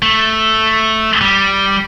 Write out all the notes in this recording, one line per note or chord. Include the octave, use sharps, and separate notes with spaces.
A3
G3